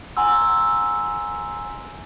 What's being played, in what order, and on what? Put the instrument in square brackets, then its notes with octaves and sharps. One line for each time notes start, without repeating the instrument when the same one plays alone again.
[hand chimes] F#5 G#5 A#5 C6 E6